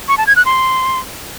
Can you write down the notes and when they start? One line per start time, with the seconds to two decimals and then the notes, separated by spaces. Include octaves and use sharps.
0.08 C#6
0.18 A5
0.27 G#6
0.36 F#6
0.45 C6